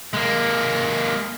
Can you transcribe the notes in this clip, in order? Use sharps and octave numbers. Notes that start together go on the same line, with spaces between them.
G#3 A#3